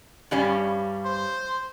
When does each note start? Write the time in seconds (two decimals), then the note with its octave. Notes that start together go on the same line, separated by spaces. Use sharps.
0.31 G2 G3 C#4
1.05 C5